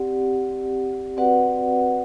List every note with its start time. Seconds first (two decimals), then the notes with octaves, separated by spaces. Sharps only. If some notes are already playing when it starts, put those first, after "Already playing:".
Already playing: C4 G4 D5 F#5
1.17 C4 F#4 B4 D5 F#5